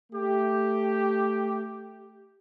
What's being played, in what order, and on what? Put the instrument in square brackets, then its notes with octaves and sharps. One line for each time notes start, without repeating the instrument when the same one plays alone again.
[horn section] A3 G4